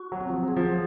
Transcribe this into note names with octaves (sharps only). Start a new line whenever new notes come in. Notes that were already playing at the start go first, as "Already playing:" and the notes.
Already playing: F#4
F#3
C4
F3
F#3
G#4
F3